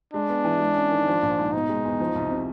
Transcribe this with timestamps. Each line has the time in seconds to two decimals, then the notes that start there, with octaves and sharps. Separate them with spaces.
0.14 G#3 D4
0.29 B3
0.44 E3
0.60 G#3
0.76 C#4
0.91 D#3
1.07 F3
1.22 A#1
1.38 G#2
1.53 B2 D#4
1.69 G#3
1.85 E2
2.00 F3
2.15 C2
2.31 C3